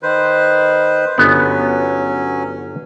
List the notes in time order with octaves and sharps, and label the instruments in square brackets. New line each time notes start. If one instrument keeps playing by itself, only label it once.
[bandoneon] D#3 B4 C5
[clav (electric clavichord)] G1 B3 [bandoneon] F#3 C#4